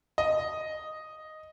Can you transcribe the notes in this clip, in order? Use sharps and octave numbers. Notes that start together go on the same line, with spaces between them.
D#5